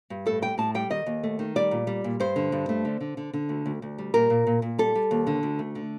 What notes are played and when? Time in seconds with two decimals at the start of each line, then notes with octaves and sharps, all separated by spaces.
0.10 G2
0.26 A2 A4
0.42 G3 G5
0.58 A2 A5
0.75 G3 G5
0.90 D#3 D#5
1.06 D#2
1.23 A3
1.39 D#3
1.56 G3 D5
1.71 A#2
1.87 G3
2.04 A#2
2.20 G2 C5
2.36 D3
2.52 G2
2.69 A3
2.85 D3
3.00 D3
3.17 D3
3.33 D3
3.49 D2
3.66 D2
3.82 D2
3.98 G3
4.14 A#2 A#4
4.30 A#2
4.47 A#2
4.62 A#2
4.78 G3 A4
4.95 G3
5.11 D#2
5.27 D3
5.43 D2
5.59 A3
5.75 D3